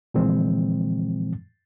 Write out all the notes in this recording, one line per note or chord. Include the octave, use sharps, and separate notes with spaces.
A#2 D3 E3 F3 G#3 C4